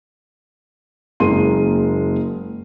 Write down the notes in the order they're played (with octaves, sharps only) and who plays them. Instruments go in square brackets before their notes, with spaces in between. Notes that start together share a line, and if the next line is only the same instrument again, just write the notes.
[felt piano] F#1 G#3 A#3 C6 D#7